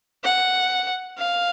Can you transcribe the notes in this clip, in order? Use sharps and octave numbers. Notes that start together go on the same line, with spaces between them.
F#5
F5